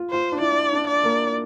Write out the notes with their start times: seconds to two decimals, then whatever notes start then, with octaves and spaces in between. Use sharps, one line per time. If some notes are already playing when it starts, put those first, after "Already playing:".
Already playing: F4
0.10 F4 C5
0.32 D4
0.41 E4 D5
0.73 D4
0.88 D5
1.04 A#3